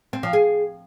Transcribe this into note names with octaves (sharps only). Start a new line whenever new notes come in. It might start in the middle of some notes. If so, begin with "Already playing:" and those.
C4
F3
G#4